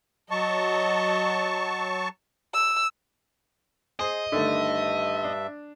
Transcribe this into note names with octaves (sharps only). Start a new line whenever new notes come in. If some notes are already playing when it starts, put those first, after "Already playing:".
F#3 D#5 A5 C#6
E6
G#4 C5 D#5
G2 D3 D#3 A3 E5
D4